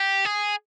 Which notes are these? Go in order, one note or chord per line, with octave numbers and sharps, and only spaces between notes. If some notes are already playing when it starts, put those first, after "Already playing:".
Already playing: G4
G#4